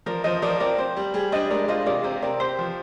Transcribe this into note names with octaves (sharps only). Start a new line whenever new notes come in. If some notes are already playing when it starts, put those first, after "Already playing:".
F3 A#4 D5
F3 C5 D#5
F3 A#4 D5
C4 A#4 D5
C4 C5
G3
G3 G#4
D4 C5 D#5
G#3 A#4 D5
F4 C5 D#5
C3 A#4 D5
C3 C5 D#5
C4 A#4 D5
G4 C5
F3